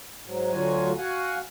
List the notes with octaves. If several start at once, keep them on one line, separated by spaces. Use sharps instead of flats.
G#2 F#3
D2 D3 F#3 F4 F#4 G#5
F#4 F5 F#5 G#5